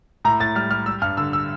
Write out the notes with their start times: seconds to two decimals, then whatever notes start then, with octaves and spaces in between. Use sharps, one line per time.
0.25 A2 A#5
0.40 A2 A6
0.55 G3 F6
0.71 G3 F6
0.86 G3 E6
1.02 G2 F6
1.17 D3 E6
1.33 E6